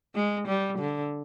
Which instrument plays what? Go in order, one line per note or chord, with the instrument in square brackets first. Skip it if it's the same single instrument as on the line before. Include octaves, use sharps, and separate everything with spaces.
[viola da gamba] G#3
G3
D3